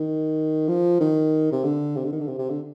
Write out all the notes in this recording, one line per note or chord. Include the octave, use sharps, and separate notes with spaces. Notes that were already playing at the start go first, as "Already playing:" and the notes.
Already playing: D#3
F3
D#3
C3
D3
C3
D3
D#3
D3
C3
C3
D3